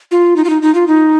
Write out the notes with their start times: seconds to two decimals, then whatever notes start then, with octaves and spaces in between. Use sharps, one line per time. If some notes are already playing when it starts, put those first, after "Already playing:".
0.11 F4
0.36 D#4
0.44 F4
0.50 D#4
0.62 D#4
0.75 F4
0.88 D#4